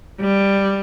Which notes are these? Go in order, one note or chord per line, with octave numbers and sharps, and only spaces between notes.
G3